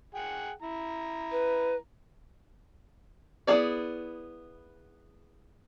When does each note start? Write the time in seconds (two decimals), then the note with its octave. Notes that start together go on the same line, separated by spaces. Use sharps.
0.14 G#4 F#5 G5
0.62 E4 A#5
1.31 B4
3.47 B3 E4 G#4 C#5 D5